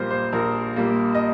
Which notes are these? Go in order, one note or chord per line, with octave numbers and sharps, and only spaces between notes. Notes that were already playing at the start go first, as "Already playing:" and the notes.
Already playing: A#1 A#2 G3 A#3 F4 A#4 C5
C5
A#1 A#4
A#2 G3 A#3
D#5